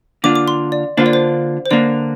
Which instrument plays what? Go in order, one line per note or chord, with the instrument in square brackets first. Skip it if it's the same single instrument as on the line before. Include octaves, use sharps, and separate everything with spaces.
[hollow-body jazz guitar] D3 A#3 D4 F4 [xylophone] D6
[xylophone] D6
C6
D5
[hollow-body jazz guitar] D3 A#3 D4 F4 [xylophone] C5
[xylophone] D5
C5
C5
[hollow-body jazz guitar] D3 A#3 D4 [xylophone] D5